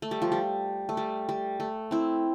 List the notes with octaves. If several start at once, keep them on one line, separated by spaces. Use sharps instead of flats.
A3
G3
F3
G3
A3
G3
G3
A3
C4 E4